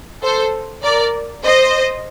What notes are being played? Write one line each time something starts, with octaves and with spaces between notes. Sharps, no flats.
A4 C5
A#4 D5
C5 D#5